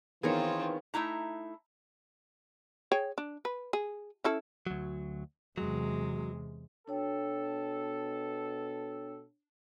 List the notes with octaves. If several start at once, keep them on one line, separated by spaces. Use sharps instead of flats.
D#3 E3 B3 C4 F4 G#4 A#4 C#5
A3 D#4 E4 A#5
G#4 C#5 G5
D4
B4
G#4
C#4 E4 A4
D2 F#3
E2 C3 F#3 G#3
B2 D4 A4 C#5 G5